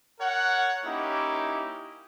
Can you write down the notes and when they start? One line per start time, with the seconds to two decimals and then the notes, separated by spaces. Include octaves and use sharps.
0.20 A#4 C#5 F#5
0.85 A#3 C#4 D#4 E4 G4